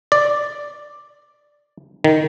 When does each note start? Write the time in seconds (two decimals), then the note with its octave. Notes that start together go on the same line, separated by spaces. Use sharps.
0.12 D5
2.04 D#3